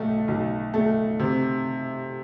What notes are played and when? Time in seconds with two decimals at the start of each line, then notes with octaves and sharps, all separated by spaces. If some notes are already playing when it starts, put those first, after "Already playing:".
Already playing: B1 A3
0.28 B1
0.74 A3
1.19 C3